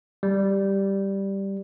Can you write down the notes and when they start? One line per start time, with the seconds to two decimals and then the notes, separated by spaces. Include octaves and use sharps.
0.23 G3